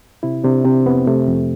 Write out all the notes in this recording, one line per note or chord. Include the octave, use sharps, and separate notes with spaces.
C3 E4
C3 D4
C3 C4
F2 B3
C3 A3
F2